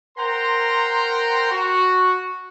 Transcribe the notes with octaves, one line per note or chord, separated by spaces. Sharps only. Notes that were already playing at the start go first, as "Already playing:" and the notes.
A#4 C5 F#5 G5 A#5 C6
F#4